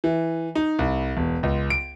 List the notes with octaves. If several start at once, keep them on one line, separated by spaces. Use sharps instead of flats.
E3
D#4
C2
E1
C#2
D7